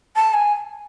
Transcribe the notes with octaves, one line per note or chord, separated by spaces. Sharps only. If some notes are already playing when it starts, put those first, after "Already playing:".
A5
G#5